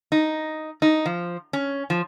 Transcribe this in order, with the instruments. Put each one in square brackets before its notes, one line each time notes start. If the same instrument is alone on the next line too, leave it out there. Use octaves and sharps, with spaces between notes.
[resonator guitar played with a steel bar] D#4
D#4
F3
C#4
F3